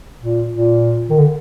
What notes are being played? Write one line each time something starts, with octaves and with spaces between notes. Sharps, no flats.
A#2
A#2
D#3
D3